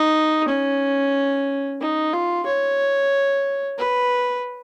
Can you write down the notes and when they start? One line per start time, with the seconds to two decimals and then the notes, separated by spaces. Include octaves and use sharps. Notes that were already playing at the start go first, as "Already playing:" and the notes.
Already playing: D#4
0.49 C#4
1.81 D#4
2.13 F4
2.46 C#5
3.79 B4